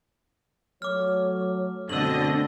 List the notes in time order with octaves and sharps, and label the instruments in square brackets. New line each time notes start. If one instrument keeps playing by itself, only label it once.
[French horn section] F#3 A3 [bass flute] C#5 [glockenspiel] D6 F6
[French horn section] F#2 B2 [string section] D3 A3 D#5 [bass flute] C4 [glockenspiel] E6 F#7